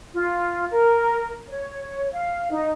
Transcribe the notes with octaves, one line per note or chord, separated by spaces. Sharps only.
F4
A#4
C#5
F5
D#4